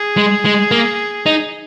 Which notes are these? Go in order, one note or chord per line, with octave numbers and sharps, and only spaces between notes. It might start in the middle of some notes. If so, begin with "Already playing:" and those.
Already playing: G#4
G#3
G#3
A#3
D#4